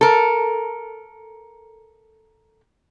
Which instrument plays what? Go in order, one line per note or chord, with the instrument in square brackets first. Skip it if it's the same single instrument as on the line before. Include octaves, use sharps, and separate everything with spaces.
[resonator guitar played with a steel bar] A4 A#4